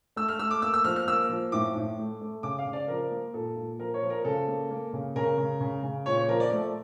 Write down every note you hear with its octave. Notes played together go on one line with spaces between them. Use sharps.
A3 E6
F6
A3 E6
D6
A#3 E6
E6
F3 F6
F6
A#3 E6
F3
A2 D6
A2
A3
A3
C#3 D6
F5
C#3
D5
F3 A#4
A#3
A#2 A4
A#2
F3 A#4
C#5
F3
A#4
C#3 A4
A#3
A#3
C#3
C#3 A#4
C#3
C#3
C#3
A#2 C#5
C#5
F3 A#4
D5
A3